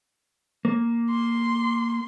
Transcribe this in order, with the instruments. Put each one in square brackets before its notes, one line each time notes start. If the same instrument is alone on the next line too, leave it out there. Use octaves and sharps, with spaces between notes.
[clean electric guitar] A#3
[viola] C6